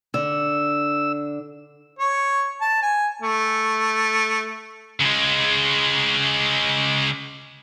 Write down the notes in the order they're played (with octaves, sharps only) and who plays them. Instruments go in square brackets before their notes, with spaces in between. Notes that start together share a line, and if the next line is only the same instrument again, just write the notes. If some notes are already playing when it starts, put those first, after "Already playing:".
[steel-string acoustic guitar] D3 [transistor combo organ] E6
[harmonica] C#5
A5
G#5
A3
[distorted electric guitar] C#3 G#3